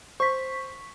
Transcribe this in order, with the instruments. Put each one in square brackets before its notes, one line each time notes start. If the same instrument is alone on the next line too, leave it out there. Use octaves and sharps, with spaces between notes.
[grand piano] C5 [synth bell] C#6 B6